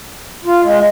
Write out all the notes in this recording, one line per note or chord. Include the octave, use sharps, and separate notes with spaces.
F4
G#3